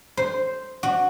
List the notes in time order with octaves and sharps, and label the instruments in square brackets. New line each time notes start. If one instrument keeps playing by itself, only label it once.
[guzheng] C5
F#4